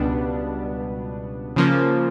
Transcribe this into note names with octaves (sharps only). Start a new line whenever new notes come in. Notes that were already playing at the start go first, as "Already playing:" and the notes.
Already playing: C#2 B2 G3 B3 D4
C#3 F3 A#3